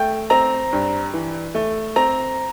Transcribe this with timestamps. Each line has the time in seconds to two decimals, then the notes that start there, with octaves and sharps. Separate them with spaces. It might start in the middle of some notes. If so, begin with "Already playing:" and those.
Already playing: A3 G5
0.30 C4 A#5
0.72 G2
1.14 E3
1.55 A3
1.96 C4 A#5